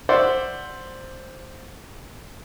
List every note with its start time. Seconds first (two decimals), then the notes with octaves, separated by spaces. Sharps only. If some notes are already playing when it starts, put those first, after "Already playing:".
0.09 C5 D5 E5 F#5